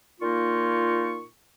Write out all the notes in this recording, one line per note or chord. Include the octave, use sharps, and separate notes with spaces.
A#2 A#3 D#4 F4 C#6